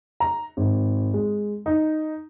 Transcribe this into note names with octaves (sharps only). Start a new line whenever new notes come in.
A#5
G#1
G#3
D#4